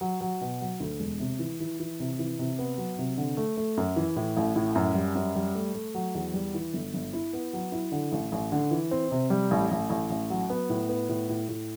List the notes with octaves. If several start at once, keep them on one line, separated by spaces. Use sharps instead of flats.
F#3
F#3
B2
F#3
D2
E1
C3
E3
E3
E3
C3
E3
C3
B3
F#3
C3
D3
A3
A3
F#2
E3
A2
A1
A2
F#2
G3
F#2
G3
A3
A3
F#3
E2
G3
E3
G1
G1
E4
B3
F#3
E4
D3
A1
A1
D3
E3
C4
C3
G3
A1
A1
A1
A1
F#3
B3
A2
B3
A2
A2
A2